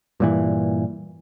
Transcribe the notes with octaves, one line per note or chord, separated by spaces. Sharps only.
G2 A#2 E3